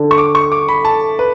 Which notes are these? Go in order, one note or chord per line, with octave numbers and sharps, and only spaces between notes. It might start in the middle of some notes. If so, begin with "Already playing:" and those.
Already playing: D3
C#6
D6
C#6
D6
B5
A5
B4